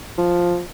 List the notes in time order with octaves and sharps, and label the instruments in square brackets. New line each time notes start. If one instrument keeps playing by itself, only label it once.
[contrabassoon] F3